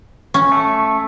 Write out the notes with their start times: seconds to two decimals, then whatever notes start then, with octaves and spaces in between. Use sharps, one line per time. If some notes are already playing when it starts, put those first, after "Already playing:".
0.34 C#4
0.52 A3